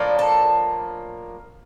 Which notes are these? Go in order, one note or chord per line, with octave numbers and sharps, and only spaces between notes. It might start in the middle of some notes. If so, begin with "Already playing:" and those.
Already playing: A2 F3 A#3 D4
A4